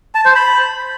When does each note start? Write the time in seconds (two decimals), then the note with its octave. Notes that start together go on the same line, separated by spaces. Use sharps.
0.15 A5
0.25 C5
0.35 B5